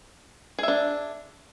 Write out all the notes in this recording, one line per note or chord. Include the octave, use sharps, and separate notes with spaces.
D4 G#4 E5